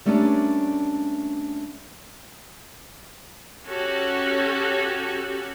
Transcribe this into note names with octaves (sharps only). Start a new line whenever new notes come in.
G3 A3 A#3 C#4 D4
C#4 F#4 G4 A4